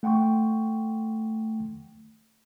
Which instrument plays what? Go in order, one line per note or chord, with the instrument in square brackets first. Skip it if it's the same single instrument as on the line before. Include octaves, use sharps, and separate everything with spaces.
[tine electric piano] A3 F#5 G5 C6 C#6